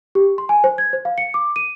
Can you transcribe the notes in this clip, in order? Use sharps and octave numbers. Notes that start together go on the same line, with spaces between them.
G4
C6
G#5
C5
G#6
C5
F5
C#7
D6
D#7